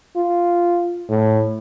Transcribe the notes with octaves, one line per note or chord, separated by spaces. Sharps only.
F4
A2